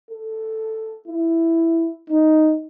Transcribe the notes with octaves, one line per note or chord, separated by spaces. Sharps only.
A4
E4
D#4